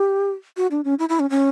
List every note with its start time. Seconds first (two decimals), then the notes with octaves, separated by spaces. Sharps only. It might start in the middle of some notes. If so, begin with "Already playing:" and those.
Already playing: G4
0.57 F#4
0.71 D4
0.85 C#4
0.99 E4
1.09 E4
1.20 C#4
1.30 C#4